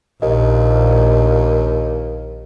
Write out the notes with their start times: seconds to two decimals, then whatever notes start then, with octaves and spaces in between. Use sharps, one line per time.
0.22 A#1 D#2 D#5